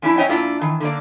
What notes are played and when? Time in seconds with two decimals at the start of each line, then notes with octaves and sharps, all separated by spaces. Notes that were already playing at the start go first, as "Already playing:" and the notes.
0.02 F3 C#4 D4 E4
0.18 C#4 C5 C#5 D#5 E5 G5
0.29 A#2 D4 E4 F4
0.61 D#3 E3
0.80 D3 A#3 D5